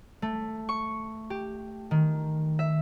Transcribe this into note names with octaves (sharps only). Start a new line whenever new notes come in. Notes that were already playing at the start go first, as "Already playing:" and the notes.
A3
C#6
G4
D#3
E5